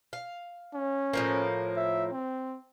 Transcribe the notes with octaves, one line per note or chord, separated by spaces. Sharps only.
F5
C#4
A2 F3 A#3
E5
C4